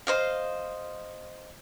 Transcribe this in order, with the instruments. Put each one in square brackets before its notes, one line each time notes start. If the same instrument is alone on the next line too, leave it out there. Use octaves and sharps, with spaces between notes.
[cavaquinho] C5 D#5 F5